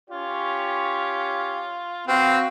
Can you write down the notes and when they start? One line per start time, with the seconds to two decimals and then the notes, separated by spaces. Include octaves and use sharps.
0.10 C#4 F4 G4 C#5
2.07 C4 F#4 B4 F5